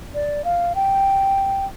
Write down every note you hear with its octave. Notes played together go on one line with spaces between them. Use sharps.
D5
F5
G5